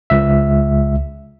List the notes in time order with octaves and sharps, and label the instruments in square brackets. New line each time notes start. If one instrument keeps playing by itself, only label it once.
[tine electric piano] C#2 E5